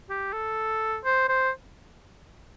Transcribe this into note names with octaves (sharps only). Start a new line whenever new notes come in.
G4
A4
C5
C5